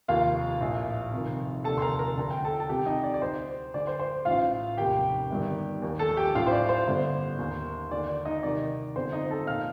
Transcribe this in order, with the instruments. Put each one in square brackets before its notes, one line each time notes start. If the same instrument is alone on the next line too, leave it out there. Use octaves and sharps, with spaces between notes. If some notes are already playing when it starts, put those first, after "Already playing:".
[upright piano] F1 D#2 D#3 F4 F5
A#1 A2
F1 F2 D#3
F1 D#2 D3 A4 A5
C6
A#4 A#5
A#4 A#5
D2 D3 A5
G5
A4 A5
A5
C2 C3 D#3 G4 G5
D#4 D#5
D5
D5
D2 D3 C5
D2 D3 D5
C5
C5
A1 A2 F4 F5
F1 D#2 D#3 G4 G5
G1 G2 D#3
D#2 D#3
A4 A5
G4 G5
A1 A2 F4 F5
C5
D5
C5
G1 G2 D3
D#2 D#3
D#2 D3 D5
D5
D#4 D#5
C2 C3 D#3 D5
G1 F2 D3 C5
D#4 D#5
A4 A5
A#2 F5 F6